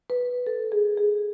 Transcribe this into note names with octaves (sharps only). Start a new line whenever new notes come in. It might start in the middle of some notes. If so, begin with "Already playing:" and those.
B4
A4
G#4
G#4